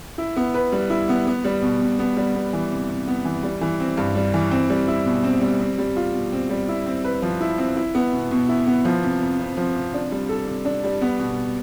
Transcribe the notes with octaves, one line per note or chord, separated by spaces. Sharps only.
E4
B3
B4
G3
E4
B3
B3
G3
B2
B2
B3
G3
B3
E3
C3
C3
B3
E3
G3
E3
C4
G2
G3
E3
C4
G3
E4
B2
C4
G3
C4
G3
F4
B2
C4
G3
E4
C4
B4
F3
E4
C4
E4
B3
B2
B2
E4
B3
F3
C3
F2
F2
F3
C3
D4
G3
A4
C3
D4
G3
B3
B2